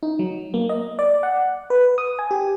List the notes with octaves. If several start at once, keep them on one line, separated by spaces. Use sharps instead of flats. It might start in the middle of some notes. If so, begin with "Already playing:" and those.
D#4
F#3
A#3
D#5
D5
F#5
B4
D#6
G#5
G4